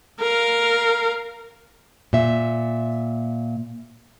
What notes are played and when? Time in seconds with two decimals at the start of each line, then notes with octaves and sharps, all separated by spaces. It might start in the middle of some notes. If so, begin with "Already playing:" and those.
0.20 A#4 F5
2.13 A#2 E5